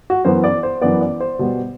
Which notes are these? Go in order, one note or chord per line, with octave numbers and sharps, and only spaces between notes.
F#4
F#2 E3 B3 C5
D5
C5
F#2 E3 B3 D5
D5
C5
B2 G3 B3